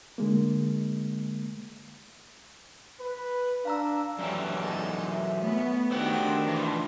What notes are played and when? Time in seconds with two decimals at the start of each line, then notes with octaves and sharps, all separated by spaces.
0.18 D3 G#3 A#3
3.00 B4
3.65 D4 F5 A#5 E6
4.19 F#2 E3 C#4 D4 G4
4.61 G#3 D#4 A4
5.10 E5
5.42 A3 B3 C#4
5.91 D#3 C4 D4 F#4 G4 F#5
6.48 E3 F3